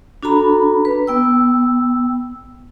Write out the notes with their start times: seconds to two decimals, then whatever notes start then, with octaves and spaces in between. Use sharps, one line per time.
0.23 D4 F#4 A4 A#5 B5
0.85 B4
1.07 B3 G5 E6